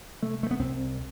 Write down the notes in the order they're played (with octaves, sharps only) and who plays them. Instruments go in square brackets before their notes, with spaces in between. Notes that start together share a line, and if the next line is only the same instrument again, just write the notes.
[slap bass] C3 A3
A3
B3
C2 C4